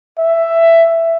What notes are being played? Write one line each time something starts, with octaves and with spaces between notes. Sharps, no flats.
E5